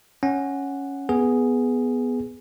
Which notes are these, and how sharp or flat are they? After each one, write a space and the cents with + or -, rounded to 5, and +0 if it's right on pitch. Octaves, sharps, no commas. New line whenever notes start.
C#4 +0 F#5 +0
B3 +0 G#4 +0